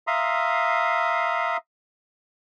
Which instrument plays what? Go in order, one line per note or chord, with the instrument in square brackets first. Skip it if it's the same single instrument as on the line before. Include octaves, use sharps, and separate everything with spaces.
[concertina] E5 F5 A#5 C6 D#6